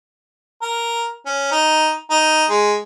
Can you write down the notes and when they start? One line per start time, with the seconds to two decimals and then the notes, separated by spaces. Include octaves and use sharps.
0.62 A#4
1.26 C#4
1.52 D#4
2.11 D#4
2.50 G#3